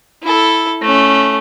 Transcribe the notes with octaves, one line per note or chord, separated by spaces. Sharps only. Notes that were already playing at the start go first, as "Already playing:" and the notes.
E4 A4
A3 C#4